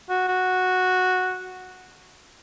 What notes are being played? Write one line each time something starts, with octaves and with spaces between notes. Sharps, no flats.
F#4
F#4